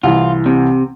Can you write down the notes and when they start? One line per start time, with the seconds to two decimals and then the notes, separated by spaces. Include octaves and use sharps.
0.03 C2 E3 F4
0.46 C3